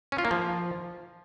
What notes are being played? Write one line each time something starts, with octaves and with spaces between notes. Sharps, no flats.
C#4
F4
A#3
F3